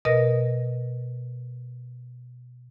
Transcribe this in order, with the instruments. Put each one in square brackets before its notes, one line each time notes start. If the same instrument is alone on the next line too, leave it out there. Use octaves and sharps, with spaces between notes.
[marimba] B2 A#4 D#5 A#6